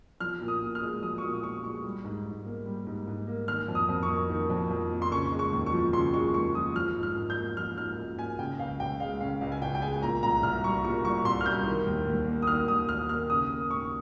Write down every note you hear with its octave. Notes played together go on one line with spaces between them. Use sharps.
F3 F6
A#2
D#6
A#2
F6
G#3
F3 D#6
C#6
A#2 D#6
A#2 C#6
G#3 C#6
G3
G#2
G#2
A#3
G3
G#2
G#2
A#3
D#3 F6
F2
D#6
F2
C#6
A#3
D#3
F2
F2
A#3
C6
C#3 C#6
G#3
C#6
D#2
C#6
F3
C#3 C6
G#3 C#6
D#2 C#6
F3 D#6
F3 F6
G#2
F6
G#2
G6
A#3
F3 F6
G#2 F6
G#2
A#3 G#5
C#3 G5
C#2 F5
C#2 G5
G#3 F5
C#3 F5
C#2 F5
G#5
C#2 G5
G5
G#3 G#5
A#2 A#5
C2 A#5
C2 F6
G3 C#6
A#2 C#6
C2 C#6
C2 C6
F6
G3 G6
D#3
D#2
D#2
A#3
D#6
D#3 F6
D#2 D#6
D#2 F6
A#3 F6
C#3 D#6
A#3
D#2 C#6